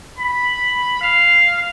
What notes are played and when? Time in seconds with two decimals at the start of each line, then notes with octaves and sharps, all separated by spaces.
0.18 B5
1.01 F5